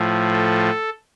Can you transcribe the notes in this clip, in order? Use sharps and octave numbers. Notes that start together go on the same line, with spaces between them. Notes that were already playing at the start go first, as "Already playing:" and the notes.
Already playing: A2 F3
A4